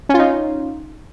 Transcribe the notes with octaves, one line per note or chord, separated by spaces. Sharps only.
C#4 D#4 F4